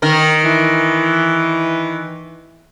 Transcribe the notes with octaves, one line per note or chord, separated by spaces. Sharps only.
D#3 A#4
E3